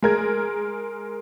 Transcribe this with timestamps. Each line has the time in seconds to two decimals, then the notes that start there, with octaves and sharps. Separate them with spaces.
0.02 G#3 A#4 G#6